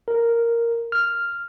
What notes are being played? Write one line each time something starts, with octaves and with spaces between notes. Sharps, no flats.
A#4
F6